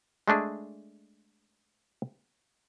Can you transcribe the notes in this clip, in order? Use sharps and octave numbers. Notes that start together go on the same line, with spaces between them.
G#3 A3 D4 G#4